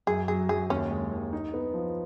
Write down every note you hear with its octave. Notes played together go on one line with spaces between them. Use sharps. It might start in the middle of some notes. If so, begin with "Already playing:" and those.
F#2 G#4
F#3 G#4
F#2 G#4
D#2 C#4
G#3
D#2
D#4
B3
F3